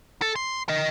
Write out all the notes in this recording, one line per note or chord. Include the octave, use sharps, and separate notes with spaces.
A4
C6
A#4 D#5